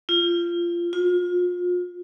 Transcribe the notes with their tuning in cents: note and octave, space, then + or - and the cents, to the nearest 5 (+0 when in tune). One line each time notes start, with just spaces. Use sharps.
F4 -20
F4 +35